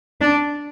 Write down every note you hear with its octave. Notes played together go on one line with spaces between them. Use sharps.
D4